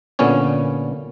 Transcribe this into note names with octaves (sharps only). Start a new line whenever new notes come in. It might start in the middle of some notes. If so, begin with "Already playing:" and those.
A#2 D3 B3 C#4 C#5